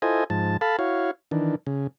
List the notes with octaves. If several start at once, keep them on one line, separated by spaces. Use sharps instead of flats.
E4 F4 A4 C5 D#5 G#5
G#2 F3 A5
A4 F5 A5 B5
E4 F#4 C#5 F5
D#3 E3 D4
C#3